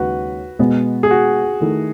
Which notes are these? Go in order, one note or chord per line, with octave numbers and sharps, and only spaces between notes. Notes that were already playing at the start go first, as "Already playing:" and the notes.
Already playing: D#2 C#3 G#3 D#4 F#4 B4
B2 G#3 B3
G#4
F#4
D#3 A3 E4